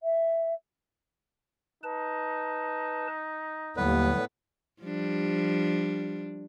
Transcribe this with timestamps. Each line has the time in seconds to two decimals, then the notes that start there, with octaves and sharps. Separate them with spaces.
0.03 E5
1.83 D#4 B4 A5
3.77 D#2 A2 D3 F#3 G3 B3 B4
4.81 F3 G3 D4